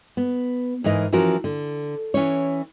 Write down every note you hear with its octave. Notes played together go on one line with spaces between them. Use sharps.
B3
G#2 E3 A#4 D#5
E3 F3 C#4 F#4 A#4
D3
E3 C#4 C#5